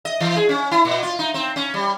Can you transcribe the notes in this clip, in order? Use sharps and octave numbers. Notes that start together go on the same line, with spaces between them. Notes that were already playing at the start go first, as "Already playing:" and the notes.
D#5
E3
G#4
C#4
E4
A#2
F4
D#4
C4
C#4
G3